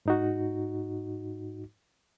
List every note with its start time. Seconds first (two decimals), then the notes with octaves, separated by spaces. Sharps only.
0.06 G#2 D#4 F#4